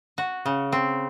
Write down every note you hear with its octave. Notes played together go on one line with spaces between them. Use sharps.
F#4
C#3
C4